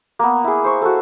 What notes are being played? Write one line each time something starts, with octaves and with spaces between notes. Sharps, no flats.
A#3 B3
E4 G#4
C5 C#6
F#4 A4